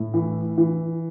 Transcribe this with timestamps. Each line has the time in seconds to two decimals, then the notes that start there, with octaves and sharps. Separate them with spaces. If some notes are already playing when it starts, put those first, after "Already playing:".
Already playing: A2
0.14 E3
0.58 E3